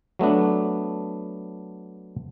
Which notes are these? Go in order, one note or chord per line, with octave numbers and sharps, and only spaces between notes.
F#3 A3 B3 D4